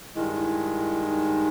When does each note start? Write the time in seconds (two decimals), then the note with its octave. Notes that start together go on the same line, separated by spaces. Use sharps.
0.15 G2 D#3 G#3 E4
0.25 D#4
0.36 E4
1.03 D#4